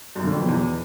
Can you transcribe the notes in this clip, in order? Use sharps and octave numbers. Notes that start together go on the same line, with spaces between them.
F#2
D3
F2
B2
E2